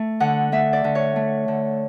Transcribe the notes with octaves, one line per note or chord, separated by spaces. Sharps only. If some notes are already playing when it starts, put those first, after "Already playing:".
Already playing: A3
D3 F#5
A3 E5
D5
D3
C#5
A3
D3